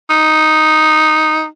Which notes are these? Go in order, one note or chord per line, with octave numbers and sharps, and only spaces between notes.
D#4